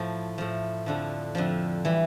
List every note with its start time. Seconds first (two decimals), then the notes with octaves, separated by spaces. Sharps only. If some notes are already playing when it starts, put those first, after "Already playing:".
Already playing: A2 F3
0.38 A2 F3
0.86 F2 D3 F3
1.35 F2 D3 F3
1.85 E3 G3